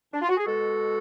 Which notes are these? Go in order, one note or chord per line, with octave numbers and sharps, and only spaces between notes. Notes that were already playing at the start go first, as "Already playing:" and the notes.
D4
F4
F#4
G#4
B2 G#3 F#4 A4